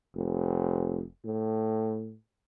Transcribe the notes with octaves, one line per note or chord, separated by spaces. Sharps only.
F1
A2